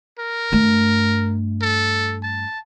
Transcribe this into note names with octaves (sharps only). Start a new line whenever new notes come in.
A#4
G2 A3
A4
A5